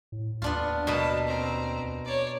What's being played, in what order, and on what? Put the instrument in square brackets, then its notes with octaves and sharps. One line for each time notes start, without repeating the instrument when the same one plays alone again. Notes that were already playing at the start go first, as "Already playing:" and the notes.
[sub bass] A2
[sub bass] D#2 [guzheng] B3 D4 F4
[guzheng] B2 A#4 B4 [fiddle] A5
[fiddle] C4 A#5
C#5 D5